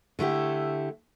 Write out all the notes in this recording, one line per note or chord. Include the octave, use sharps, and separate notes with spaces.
D3 A3 E4 G4